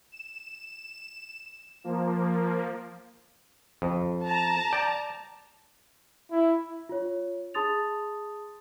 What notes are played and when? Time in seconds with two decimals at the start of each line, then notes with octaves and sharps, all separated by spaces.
0.12 E7
1.84 F3 A#3
3.82 F2
4.26 A5 A#5
4.73 D5 G5
6.31 E4
6.89 F4 C#5
7.54 G#4 A5 C6 D#6 A6 F7